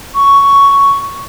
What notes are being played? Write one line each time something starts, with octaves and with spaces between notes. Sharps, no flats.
C#6